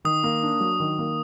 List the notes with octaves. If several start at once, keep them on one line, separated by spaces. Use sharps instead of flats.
D#3 D#6
A#3
D4
F#3
D#3
A#3